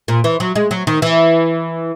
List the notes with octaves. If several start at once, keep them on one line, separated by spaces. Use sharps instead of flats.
A#2
E3
F#3
G#3
F#3
D#3
E3